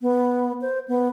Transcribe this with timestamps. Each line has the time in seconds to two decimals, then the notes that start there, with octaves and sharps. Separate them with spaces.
0.01 B3
0.61 C5
0.88 B3